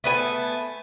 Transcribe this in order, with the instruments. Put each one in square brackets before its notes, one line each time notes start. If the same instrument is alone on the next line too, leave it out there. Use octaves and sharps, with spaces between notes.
[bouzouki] A3 B3 G#5